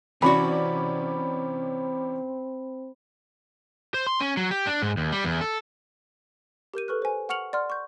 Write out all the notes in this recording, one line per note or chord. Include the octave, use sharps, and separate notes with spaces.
C3 E3 C4 C#4 F#4 D5 B5
C5
C6
C#4
F#3
G4
D4
G#2
D#2
G3
E2
A4
G4 A#4 G6 D#7
A4 B4 C#6 F6 F#6
C5 G#5
F#5 C#6 F6 C#7 F7 F#7
D5 F#5 C6 F6
C#6 G6